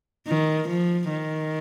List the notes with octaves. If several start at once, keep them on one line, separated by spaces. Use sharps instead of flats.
D#3
F3
D#3